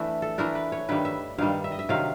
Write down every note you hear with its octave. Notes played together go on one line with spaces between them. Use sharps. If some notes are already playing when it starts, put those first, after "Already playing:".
Already playing: E3 A3 D4 E5
A4
E3 A3 D4 A#4
B4
C#5
G2 D#3 G3 B4
E5
G2 D#3 G3 F5
E5
D#5
E5
C3 D#3 F#3 F5